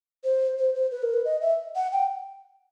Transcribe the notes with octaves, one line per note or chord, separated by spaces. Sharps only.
C5
C5
C5
B4
A#4
B4
D#5
E5
F#5
G5